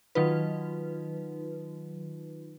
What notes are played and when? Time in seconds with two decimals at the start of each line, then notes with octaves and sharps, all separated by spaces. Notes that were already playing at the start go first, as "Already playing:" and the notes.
0.15 D#3 F#3 D#4 F4 B4